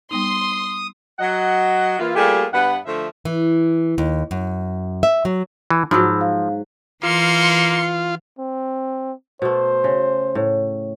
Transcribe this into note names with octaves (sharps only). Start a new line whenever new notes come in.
G3 B3 D#4 C6 D#6
F#3 D#5 F#5
E3 A#3 F4
G3 A3 A#3 F4 G4 G#4
G2 B3 B4 F#5
D3 F3 A3 E5
E3
D#2
F#2
E5
F#3
E3
G#2 F3 F#3 B5 E6
F5
E3 A#3 F4 C6 C#7
C4
B2 A3 C5
C#3
A2